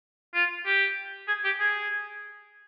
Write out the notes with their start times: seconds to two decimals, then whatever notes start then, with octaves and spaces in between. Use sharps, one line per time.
0.35 F4
0.66 G4
1.28 G#4
1.45 G4
1.60 G#4